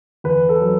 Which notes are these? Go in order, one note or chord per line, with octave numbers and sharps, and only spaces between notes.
E2 B4
A4
F#3